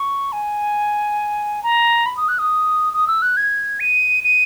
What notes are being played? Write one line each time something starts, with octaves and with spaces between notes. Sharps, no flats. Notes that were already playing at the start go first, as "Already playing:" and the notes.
Already playing: C#6
G#5
A#5
B5
D#6
F#6
D#6
D#6
E6
F#6
G#6
D#7
D#7